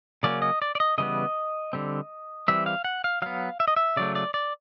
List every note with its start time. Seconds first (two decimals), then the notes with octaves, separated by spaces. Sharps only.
0.23 C#3 F#3 A#3 C#4 D5
0.42 D#5
0.62 D5
0.75 D5
0.80 D#5
0.98 C#3 E3 G3 B3 D#5
1.73 D3 G3 C4
2.48 E3 G3 C4 E5
2.66 F5
2.84 F#5
3.04 F5
3.22 F#3 B3 F5
3.60 E5
3.68 D#5
3.76 E5
3.97 C#3 F#3 A3 D5
4.15 D5
4.34 D5